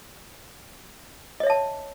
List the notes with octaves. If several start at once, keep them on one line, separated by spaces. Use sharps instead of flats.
C#5 D#5 E5 A5